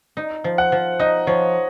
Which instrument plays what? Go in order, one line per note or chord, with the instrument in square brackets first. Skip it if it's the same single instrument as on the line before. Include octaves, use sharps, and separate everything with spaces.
[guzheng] D#4
F3
[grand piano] F#5
[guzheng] F3
[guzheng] D#4 [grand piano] D#5
[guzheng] F3 [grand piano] C#5